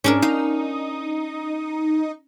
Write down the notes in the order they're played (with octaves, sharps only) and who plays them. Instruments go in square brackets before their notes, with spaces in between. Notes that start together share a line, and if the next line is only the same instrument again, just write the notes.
[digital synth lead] G#2 [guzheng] C#4 D4 A#4
[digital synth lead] D#4 [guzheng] F5